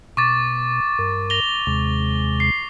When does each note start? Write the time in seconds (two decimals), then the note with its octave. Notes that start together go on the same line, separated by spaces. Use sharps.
0.17 B2 C#6 D6 A6
0.99 G2 A#4
1.30 A#6 F7 G7
1.67 D#2 C3 G#3
2.40 C7